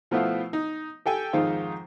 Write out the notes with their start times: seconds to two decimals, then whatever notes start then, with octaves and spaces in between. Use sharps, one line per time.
0.11 B2 F3 A3 B3 E4 F4
0.53 D#4
1.06 G4 A4 G5 G#5
1.33 F2 G#2 D#3 D#4 F4 C5